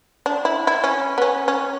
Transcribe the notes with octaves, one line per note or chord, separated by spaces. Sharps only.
D4
E4
E4
C#4
B3
C#4
C#4